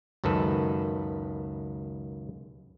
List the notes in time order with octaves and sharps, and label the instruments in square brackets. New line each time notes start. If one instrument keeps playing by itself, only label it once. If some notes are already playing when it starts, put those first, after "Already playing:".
[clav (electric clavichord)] C#2 F#2 D#3 A4 B4